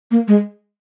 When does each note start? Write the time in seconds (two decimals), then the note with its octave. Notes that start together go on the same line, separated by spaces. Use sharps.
0.11 A#3
0.28 G#3